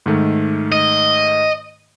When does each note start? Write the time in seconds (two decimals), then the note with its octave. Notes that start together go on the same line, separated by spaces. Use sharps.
0.06 G#2 D#3 A3
0.72 D#5